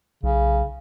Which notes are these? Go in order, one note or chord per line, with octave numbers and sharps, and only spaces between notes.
B1 C#3